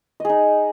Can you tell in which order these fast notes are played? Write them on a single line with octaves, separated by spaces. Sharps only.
D#5 G#4 D#4